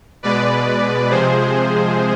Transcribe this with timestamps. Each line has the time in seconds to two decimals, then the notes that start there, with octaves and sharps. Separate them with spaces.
0.23 B2 G#3 B4 D5
1.09 C3 F3 G#3 G#4 C5